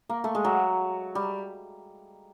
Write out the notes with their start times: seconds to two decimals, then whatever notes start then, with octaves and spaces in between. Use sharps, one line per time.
0.09 A#3
0.24 A3
0.35 G#3
0.45 F#3
1.15 G3